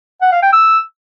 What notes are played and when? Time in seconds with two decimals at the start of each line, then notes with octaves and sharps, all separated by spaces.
0.22 F#5
0.32 F5
0.42 G5
0.53 E6